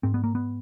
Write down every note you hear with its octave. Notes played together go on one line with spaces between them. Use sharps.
G#2 C4
B3
A#3
B3